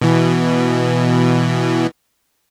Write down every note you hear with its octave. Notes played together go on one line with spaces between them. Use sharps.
B2 E3